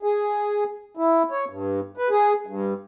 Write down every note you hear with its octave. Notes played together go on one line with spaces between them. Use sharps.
G#4
E4
C#5
G2
B4
G#4
G2